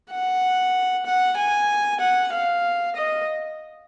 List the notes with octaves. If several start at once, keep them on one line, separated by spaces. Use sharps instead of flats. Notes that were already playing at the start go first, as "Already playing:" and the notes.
F#5
F#5
G#5
F#5
F5
D#5